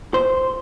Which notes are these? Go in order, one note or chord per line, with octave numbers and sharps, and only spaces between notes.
C5